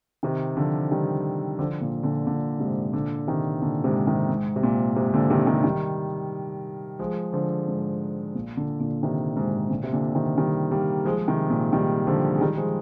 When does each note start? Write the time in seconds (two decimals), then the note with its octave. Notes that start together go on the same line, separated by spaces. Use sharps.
0.23 C3 D#3
0.57 D3 F3
0.91 D#3 G3
1.59 D3 F3
1.81 A#2 D3
2.03 A#2 D3
2.26 A#2 D3
2.60 G#2 C3
2.93 A#2 D3
3.27 C3 D#3
3.62 A#2 D3
3.84 G#2 C3
4.07 C3 D#3
4.29 G#2
4.56 C3
4.63 A#2
4.96 G#2 C3
5.13 A#2 D3
5.30 C3 D#3
5.47 C3 D#3
5.64 D#3 G3
6.99 F3 G#3
7.33 D3 F3
7.68 G#2
8.35 A#2
8.57 A#2 D3
8.80 A#2 D3
9.03 C3 D#3
9.36 G#2 C3
9.70 A#2 D3
9.83 C3
9.92 A#2 D3
10.15 C3 D#3
10.38 D#3 G3
10.71 G3 A#3
11.05 F3 G#3
11.28 C3 D#3
11.50 A#2
11.73 D#3 G3
12.07 D3 F3
12.35 G#3
12.41 D#3 G3
12.57 F3 G#3